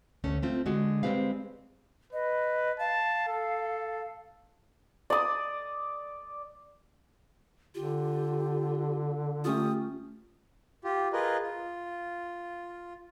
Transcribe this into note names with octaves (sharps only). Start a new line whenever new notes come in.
D2 A3 C#4
A3 C4 F4
D3 G#3 F#4
G3 G#3 C4 G4 B4 F5
B4 D#5
F5 A5
A4
D5 D#6
D3 F4 G4
A3 C#4 F4 G4 D#6
F4 G4
F4 G#4 A#4 B4 D#5
F4